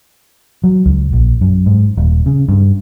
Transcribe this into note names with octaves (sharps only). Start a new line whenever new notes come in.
F#3
C#2
A#1
F#2
G#2
D#1
C#3
G2